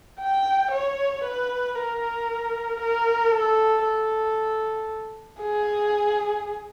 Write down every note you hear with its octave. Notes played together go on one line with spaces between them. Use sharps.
G5
C#5
B4
A#4
A#4
A4
A4
G#4